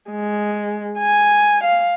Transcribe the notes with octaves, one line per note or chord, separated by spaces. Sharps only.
G#3
G#5
F5